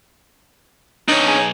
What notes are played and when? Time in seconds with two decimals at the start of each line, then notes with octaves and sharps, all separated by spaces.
1.08 B1 D4 D#4 C#5
1.28 G#4